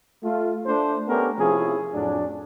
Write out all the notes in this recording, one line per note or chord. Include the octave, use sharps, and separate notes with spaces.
A3 F4
A3 D4 C5
A3 B3 C#4 D4 G4 A#4
C3 F3 C#4 E4 G#4
F2 A2 F#3 C#4 D4